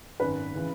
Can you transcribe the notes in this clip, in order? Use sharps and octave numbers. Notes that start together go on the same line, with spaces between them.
G#1 F#2 D#3 B4
C#3 E3